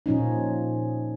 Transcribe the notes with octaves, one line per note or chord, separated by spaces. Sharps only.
A#2 F3 C#4 D#4